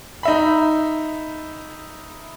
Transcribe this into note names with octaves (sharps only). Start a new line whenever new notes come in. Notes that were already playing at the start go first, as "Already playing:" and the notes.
D#4 E5 B5